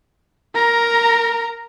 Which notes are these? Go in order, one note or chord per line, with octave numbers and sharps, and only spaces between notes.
A#4 A#5